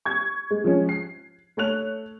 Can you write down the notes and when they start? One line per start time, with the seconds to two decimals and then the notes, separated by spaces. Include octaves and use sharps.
0.05 C#6 G#6
0.51 G#3
0.64 F3 G#3 C#4
0.89 C7
1.57 A3 C#5 F#6 F7